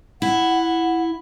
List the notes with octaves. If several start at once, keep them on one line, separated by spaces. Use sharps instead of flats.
E4 F#5